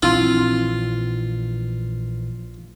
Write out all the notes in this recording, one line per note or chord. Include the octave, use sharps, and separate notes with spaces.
A#1 E3 C4 D4 E4 F4